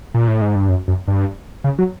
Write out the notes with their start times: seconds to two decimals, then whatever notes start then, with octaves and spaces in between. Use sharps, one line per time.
0.14 A#2
0.28 A2
0.42 G#2
0.55 G2
0.69 F#2
0.88 F#2
1.08 G2
1.64 C#3
1.78 F#3